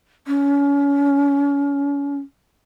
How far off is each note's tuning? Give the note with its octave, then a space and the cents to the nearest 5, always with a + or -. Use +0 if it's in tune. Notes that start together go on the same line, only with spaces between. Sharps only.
C#4 +30